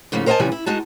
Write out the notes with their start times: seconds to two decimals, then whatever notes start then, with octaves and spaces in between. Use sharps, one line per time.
0.12 G#2 C#3 F3 A3 A#3
0.26 A#4 C5 D#5 F5 G#5 A5
0.40 C3 E3 F3 G3 C#4 G#5
0.52 E4
0.66 G#3 D#4 F#4 A5